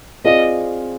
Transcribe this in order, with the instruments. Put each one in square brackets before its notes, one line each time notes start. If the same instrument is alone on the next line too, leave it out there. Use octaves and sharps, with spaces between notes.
[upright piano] C4 F4 G#4 D5 F5 [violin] D#5